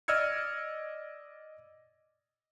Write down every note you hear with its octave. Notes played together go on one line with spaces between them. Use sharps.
D5 D#5 E6 F6 G#6 C#7